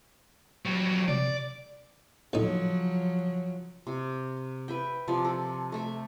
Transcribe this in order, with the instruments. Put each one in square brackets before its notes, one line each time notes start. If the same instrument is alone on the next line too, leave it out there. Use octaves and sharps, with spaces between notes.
[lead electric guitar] F#3 G3
[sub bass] C3 [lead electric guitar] D5
[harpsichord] D2 A2 D#4 [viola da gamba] C#3 F3 F#3
[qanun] C3
B4 E5 G5
C3 F3 D5
A4
A3 A4 E5